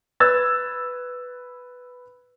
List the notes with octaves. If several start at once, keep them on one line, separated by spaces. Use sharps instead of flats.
B4 E6 G#6 A6